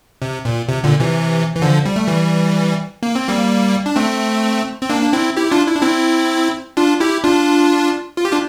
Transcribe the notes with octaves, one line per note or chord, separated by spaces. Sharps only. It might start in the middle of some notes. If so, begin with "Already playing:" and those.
C3
A#2
C3
A#2 D3
C3 E3
E3
D3 F3
G3
A3
E3 G3
A#3
C4
G3 A#3
D4
A3 C4
C4
A#3 D4
D4
C4 E4
E4 G4
E4
D4 F4
E4
D4
C4 E4
D4 F4
E4 G4
D4 F4
F4
G4
D4 F4